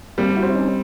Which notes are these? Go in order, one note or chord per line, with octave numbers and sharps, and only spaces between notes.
G3 A#3 C4
E4 F#4
C4
C#4 D#4